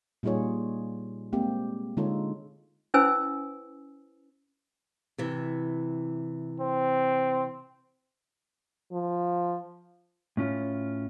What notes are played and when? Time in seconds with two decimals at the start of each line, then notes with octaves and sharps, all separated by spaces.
0.23 A#2 G3 D#4 F4 G#4 C#5
1.33 G#3 A#3 C4 G4
1.97 D3 G#3 D#4 F4 A4 C#5
2.94 C#4 E4 B4 C5 G#5 E6
5.18 C3 E3
6.60 C4
8.92 F3
10.37 A2 C#4 F4